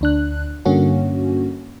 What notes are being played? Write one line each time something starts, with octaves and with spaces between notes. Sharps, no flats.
D2 D4 F#6
G2 D3 A#3 C#4 F#4